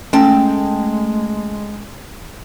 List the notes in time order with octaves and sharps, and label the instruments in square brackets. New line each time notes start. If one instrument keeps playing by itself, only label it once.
[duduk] G#3 [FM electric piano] A3 [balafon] C#4 [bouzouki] G5 A5